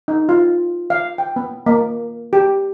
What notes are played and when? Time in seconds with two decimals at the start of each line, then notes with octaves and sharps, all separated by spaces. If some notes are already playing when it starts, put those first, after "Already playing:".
0.08 D#4
0.29 F4
0.90 F5
1.18 G5
1.36 B3
1.66 A#3
2.33 G4